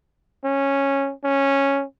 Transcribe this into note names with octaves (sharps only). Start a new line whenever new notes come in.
C#4
C#4